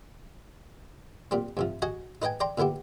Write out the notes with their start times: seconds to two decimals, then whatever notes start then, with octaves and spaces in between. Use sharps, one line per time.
1.31 A#2 G3 C4
1.57 G2 C3 F3
1.82 F#4 D#5 F#5 G#5
2.22 D#4 B4 D#5 G5 G#5
2.40 D5 G5 A#5 C6
2.58 A#2 D3 B3 E4 G4